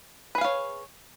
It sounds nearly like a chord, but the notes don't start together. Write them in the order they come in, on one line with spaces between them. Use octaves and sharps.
B4 G#4 F5 C#5